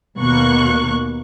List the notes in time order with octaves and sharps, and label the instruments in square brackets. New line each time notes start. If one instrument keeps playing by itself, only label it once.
[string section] D#2 B2 A#3 C#6 F#6